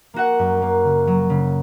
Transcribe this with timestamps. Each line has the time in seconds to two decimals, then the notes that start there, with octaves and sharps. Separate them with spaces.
0.14 A#3 F#4 F#5
0.39 F#2
0.62 A#3
0.84 C#3
1.07 F#3
1.30 C#3